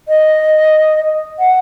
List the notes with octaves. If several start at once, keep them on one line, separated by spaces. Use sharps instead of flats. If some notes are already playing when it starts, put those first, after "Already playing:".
D#5
F#5